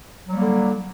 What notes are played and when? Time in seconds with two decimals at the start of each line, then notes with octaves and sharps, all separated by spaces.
0.28 F#3
0.32 G3
0.36 A#3
0.40 D3